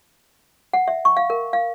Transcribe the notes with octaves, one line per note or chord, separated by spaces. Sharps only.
F#5
E5
C#6
F5
A#4
F5